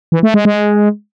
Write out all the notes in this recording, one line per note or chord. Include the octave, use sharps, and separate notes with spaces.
E3
A3
G#3
G#3